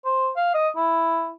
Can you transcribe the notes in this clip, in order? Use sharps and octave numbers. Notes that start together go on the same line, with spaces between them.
C5
F5
D#5
E4